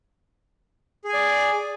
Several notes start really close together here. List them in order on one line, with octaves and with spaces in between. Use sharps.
G#4 G#5 D5